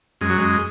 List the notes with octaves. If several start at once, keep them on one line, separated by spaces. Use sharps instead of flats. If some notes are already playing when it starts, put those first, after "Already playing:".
F#2 G#3
F#3
F#2 G#3